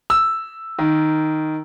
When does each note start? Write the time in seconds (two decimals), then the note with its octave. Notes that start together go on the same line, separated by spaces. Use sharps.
0.10 E6
0.79 D#3